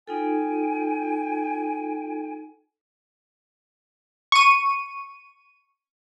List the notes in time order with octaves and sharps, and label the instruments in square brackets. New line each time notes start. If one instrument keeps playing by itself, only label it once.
[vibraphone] D#4 F4 A4 [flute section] G5 G#5
[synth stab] C#6 D#7